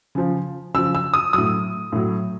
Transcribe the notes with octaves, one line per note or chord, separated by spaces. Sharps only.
C#3 F3
C#3 F3 E6
E6
D#6
A2 F#3 D#6
A2 F#3